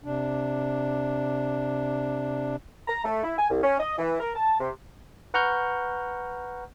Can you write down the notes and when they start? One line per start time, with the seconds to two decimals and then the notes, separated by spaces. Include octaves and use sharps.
0.04 C3 D4
2.88 A#5
3.04 A3
3.23 E4
3.38 G#5
3.50 C2
3.63 C#4
3.79 D#5
3.98 E3
4.20 A#4
4.36 A5
4.60 C3
5.34 B4 F#5 A#5 C#6 F6 G6